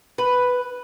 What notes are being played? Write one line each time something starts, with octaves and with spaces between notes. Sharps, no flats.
B4